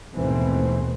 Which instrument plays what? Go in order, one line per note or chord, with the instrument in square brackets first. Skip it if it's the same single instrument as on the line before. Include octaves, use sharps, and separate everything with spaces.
[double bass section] D#2 G#2 B2 E3 A3 C4